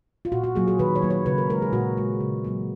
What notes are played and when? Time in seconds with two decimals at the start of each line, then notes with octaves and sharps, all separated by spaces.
0.25 F4
0.32 A#2 F#4
0.43 F#4
0.55 F#3 A#3 G#4
0.68 G#4
0.79 D#3 B4
0.95 C#5
1.02 F#3 A#3
1.10 C#5
1.26 C#3 B4
1.38 A#4
1.50 G#3 A#4
1.62 G#4
1.73 A#2 F#4
1.97 G#3
2.20 C#3
2.44 F#3 A#3